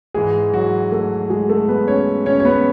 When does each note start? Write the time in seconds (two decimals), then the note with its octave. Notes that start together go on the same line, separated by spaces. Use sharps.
0.14 G#2 E3 G#3 G#4
0.54 F#3 F#4
0.92 A3 A4
1.30 G#3 G#4
1.49 A3 A4
1.68 B3 B4
1.87 C#4 C#5
2.26 C#4 C#5
2.40 C#5
2.45 B3 B4